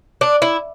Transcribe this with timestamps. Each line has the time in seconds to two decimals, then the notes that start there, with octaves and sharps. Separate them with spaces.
0.21 D4
0.42 E4